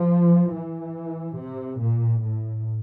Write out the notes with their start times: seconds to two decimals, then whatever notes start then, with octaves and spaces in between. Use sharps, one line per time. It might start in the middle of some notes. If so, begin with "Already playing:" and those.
Already playing: F3
0.52 E3
1.36 C3
1.79 A#2
2.20 A2